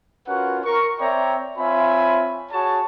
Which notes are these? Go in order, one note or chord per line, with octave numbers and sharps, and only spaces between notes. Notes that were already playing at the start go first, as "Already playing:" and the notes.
C#4 F4 F#4 A#4 B4 F#5
A#4 C#6
C4 C#5 D5 E5 G5 A#5
C4 F4 C#5 E5 G#5 B5
F#4 G#4 C#5 A5